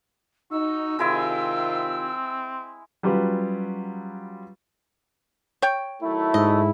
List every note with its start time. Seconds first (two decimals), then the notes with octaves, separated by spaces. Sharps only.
0.51 D#4 F#4 E6
0.99 C3 D#3 G#3 C4 E4 F4 G#5
3.03 F#3 G3 C#4 F4 G4 B4
5.62 C#5 G5
6.03 D#3 F#3 A3 E4
6.34 G#2 D#5